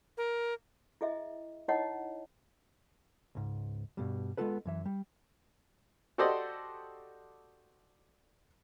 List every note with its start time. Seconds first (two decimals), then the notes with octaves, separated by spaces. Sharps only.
0.17 A#4
1.01 E4 G#4 D#5 E5
1.68 D#4 E4 C#5 D#5 F#5
3.35 C#2 G#2
3.97 G2 B2 G3
4.37 G#3 A#3 B3 F4 A4 B4
4.65 F#2 E3 E5
4.86 G3
6.18 F#4 G4 A4 C5 D5 D#5